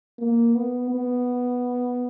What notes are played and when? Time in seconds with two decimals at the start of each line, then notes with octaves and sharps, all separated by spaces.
0.19 A#3
0.55 B3
0.91 B3